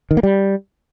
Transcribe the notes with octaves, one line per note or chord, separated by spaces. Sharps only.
D#3
A#3
G3